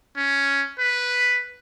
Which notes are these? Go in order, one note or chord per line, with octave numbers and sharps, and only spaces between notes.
C#4
B4